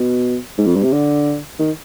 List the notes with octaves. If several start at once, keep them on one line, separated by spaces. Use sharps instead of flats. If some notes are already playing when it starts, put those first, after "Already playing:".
Already playing: B2
G#2
F2
G2
C3
D3
D#3